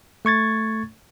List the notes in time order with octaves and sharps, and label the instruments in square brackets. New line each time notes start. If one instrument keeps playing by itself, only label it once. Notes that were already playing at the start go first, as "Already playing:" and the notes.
[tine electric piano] A3 C#6 G#6 A6